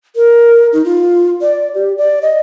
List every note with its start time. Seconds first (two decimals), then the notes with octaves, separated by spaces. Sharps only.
0.15 A#4
0.73 D#4
0.85 F4
1.41 D5
1.74 G4
1.98 D5
2.22 D#5